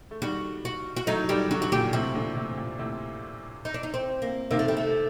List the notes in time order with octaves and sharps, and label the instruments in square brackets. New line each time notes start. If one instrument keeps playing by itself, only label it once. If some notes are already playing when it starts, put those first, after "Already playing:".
[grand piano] A3
[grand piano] D#3 G3 [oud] F#4
[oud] F#4
F#4
[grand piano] F#3 A3 [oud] D#4
[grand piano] D#3 G3 [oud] G4
[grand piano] D3 F#3 [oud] F#4
[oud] F#4
[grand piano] A#2 [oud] G4
[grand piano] A2 C3 [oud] F#4
[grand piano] A#2 D3
A2 C3
C3
A#2
A2 C3
[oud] D#4
D4
D#4
C4
A#3
[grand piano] C3 D#3 [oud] A#3
[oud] A3
G3
A3